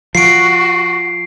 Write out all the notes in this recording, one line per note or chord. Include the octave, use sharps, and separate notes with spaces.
F3 F#4 C7 D7